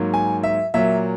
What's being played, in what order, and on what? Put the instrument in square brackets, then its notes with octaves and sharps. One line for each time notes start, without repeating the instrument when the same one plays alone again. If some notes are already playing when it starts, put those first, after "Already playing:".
Already playing: [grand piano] G#2 F#3 A#3
G#5
E5
A#2 F#3 A#3 E5